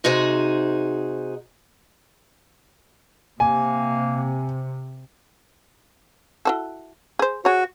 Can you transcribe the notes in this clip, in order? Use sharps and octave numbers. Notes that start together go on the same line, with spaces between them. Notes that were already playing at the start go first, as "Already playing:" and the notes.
C3 D#4 F#4 G#4 C5
C3 A#3 G#5
E4 F#4 A4
G#4 C5
F#4 G#4 C#5